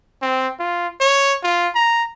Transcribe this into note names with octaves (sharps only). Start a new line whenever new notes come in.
C4
F4
C#5
F4
A#5